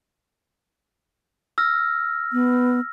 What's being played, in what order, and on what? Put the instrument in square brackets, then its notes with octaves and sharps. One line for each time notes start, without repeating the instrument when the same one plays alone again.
[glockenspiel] E6 F6 A#6
[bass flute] B3